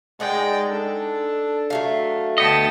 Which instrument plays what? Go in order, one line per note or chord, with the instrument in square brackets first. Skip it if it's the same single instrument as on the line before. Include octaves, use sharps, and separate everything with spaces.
[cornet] G#3 [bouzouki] D#4 F#5 [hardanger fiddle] D5 G5
[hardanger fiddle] D4 [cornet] A4
[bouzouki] F#3 A3 F5
[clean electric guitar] D2 B3 D#5 [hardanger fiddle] G5 A5